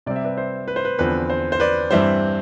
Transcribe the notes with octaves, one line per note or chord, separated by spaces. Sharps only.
C3 G3 C4 D5
E5
B4 D5
C5
B4
C5
B4
E2 D3 F3 C4 B4
C5
C5
B4 D5
G2 E3 G3 C4 C5 E5